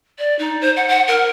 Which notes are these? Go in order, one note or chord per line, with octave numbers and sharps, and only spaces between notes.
D5
D#4
C5
F#5
F#5
A#4